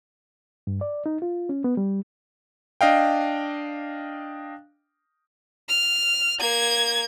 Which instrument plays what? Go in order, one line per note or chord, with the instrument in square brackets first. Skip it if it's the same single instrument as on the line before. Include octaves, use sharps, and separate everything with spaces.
[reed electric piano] G2
D5
D#4
F4
C#4
B3
G3
[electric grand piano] D4 D#5 F5 G5
[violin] F6
A#3 G#6